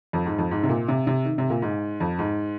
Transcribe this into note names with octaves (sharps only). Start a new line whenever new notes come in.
F2
G#2
F2
G#2
C3
A#2
C3
C3
D#3
C3
A#2
G#2
F2
G#2